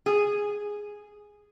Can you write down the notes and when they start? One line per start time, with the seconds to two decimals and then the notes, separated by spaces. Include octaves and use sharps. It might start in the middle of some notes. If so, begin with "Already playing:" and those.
0.06 G#4